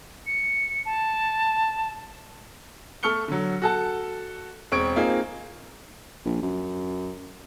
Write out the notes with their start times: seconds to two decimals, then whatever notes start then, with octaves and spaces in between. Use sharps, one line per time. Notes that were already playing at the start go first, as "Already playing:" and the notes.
0.27 C#7
0.86 A5
3.03 A3 A4 C#6 F6 C#7 G7
3.28 D3 F#3
3.62 F#4 A4 A5
4.72 E1 C4 C#6 G#6 D7
4.96 A#3 C4 D#4 F4 G#4
6.25 A#1
6.42 F#2